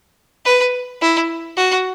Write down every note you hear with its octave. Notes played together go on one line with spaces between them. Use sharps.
B4
E4
F#4